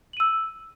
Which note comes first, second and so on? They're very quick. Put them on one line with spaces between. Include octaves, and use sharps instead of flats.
F#7 D#7 E6